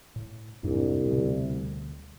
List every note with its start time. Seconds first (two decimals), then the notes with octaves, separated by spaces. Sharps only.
0.16 A2
0.64 C2 F2 G#2 D4
1.05 D2 B2 G3